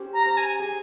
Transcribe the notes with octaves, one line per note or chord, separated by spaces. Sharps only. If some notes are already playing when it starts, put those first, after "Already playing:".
Already playing: C#4 G4 C5
A#5
C5 A#5
G#5
G#4 G#5